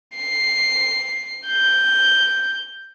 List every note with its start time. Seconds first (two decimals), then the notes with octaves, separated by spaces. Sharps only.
0.17 C7
1.47 G6